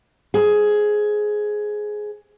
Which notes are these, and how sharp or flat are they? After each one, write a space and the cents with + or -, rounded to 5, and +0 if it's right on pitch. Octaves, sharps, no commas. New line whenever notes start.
G#4 +10 C5 +15